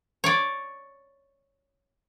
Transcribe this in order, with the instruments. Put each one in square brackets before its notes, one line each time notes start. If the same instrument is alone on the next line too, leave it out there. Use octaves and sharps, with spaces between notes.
[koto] C#5 D5